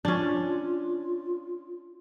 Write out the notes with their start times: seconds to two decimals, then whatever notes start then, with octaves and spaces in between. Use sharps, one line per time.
0.05 C#4 D4 F4